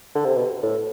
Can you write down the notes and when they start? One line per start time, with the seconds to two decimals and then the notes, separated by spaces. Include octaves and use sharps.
0.15 D3
0.25 C3
0.35 B2
0.63 A2